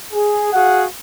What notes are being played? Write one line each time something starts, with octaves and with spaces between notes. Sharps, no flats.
G#4
F#4 G#4 F5 F#5